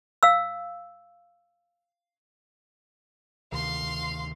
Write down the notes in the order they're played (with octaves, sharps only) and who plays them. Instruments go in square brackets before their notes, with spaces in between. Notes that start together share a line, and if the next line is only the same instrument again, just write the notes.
[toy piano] F5 E6
[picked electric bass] D2 C3 D#3 [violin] F5 C6